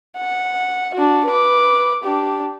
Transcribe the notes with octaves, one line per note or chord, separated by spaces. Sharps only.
F#5
D4 F#4
B4 D6
D4 G4